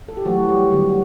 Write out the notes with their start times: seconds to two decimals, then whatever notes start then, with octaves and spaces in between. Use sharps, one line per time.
0.08 A4
0.17 G4
0.25 E3 F#3 A3 F#4
0.49 G3 G4
0.71 D3 F#3 G3 B3 G4
0.89 F#4